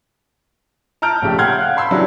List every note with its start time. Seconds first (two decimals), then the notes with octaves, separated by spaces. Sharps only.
1.02 A5 A#5 F6 G6 D7
1.22 A#1 C#3 A3 G4
1.38 F#5 G5 C6 F6 G6 G#6
1.58 F5 F#6
1.77 B5 C6 E6
1.91 C#3 E3 F#3 G3 D4 E4